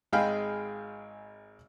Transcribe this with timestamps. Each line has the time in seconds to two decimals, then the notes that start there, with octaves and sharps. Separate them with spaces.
0.13 G#1 G#3 G#4 F5 G5 B5